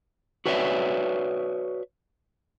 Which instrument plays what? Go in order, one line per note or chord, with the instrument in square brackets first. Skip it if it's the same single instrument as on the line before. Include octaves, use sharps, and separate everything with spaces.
[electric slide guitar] F#4 B4 C#5 D5 E5